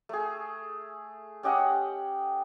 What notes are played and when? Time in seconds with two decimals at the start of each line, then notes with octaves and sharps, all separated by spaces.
0.09 A3 G#4
1.43 C#4 G4 D#5 F#5